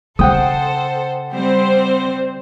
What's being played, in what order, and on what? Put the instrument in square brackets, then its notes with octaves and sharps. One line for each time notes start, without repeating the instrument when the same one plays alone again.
[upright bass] C#3 [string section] A4 C5 [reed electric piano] F#5 G5 D#6
[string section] G3 C4 C5